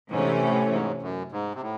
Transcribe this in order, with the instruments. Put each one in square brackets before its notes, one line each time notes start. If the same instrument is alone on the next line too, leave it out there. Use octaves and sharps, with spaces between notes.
[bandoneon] G#2 [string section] C3 E3 A3 C#4
[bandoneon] A2
G#2
F#2
G#2
C3
A2